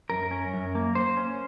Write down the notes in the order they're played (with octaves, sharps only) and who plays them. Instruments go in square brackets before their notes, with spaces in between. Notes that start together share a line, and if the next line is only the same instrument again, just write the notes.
[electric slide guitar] F#2 A#4
C#4
F#2
A#3
A#3 C5
C#4